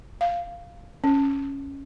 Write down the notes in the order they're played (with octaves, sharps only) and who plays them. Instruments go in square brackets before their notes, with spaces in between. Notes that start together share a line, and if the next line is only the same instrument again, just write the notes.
[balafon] F5
C#4